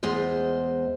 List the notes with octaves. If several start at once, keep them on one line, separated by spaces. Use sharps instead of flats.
E2 G#3 C5 D#5